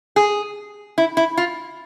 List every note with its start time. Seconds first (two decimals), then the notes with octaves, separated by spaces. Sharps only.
0.16 G#4
0.98 E4
1.17 E4
1.37 F4